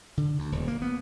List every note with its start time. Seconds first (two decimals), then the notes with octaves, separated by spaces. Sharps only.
0.17 D3
0.39 D2
0.52 D#1
0.68 A#3
0.82 B3